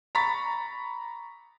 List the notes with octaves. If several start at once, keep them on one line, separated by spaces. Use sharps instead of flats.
A#5 B5 C#6 A6 B6